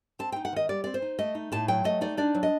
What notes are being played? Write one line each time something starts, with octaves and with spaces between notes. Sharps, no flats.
C4 A5
D#4 G5
F#5
D#3 D#5
G3 D5
C4 D5
C5
D#4
A3 D#5
D#4
A2 A5
F#3 G5
A3 D#5
D#4 D5
D4 D5
F#3
D#5